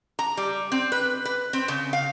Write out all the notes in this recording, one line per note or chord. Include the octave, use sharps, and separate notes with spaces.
A#5
G3
C4
B4
B4
C4
C#3
F5